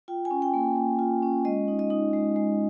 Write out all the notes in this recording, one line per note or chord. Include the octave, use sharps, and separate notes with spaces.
F4 G5
G#5
C#4
G5
A#3
A#3
F4
C#4
G#3 D#5
D#4
D#5
D#4
G#3
G#3